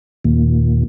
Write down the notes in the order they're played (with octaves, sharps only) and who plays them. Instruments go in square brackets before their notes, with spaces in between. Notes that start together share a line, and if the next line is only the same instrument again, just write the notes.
[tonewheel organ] D#2 A#2